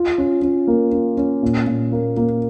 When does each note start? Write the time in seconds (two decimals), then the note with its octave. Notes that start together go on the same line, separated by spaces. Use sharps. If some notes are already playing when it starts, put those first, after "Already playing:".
Already playing: F4
0.18 C#4
0.42 C#4
0.67 A#3
0.93 C#4
1.17 C#4
1.43 A#2
1.67 A#2
1.92 A#3
2.17 A#3